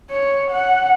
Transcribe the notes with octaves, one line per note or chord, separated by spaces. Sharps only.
C#5
F#5